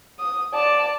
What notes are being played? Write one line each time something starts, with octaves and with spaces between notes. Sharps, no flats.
D#6
D5 A5